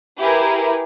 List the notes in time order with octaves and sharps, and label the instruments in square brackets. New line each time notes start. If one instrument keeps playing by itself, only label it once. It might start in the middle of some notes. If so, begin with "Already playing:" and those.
[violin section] E4 G4 G#4 A#4 B4